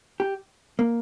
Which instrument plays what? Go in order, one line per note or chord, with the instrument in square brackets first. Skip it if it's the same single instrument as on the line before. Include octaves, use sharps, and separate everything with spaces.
[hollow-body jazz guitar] G4
A#3